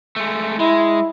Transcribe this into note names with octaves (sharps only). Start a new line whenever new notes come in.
G#3 A3
G#3 E4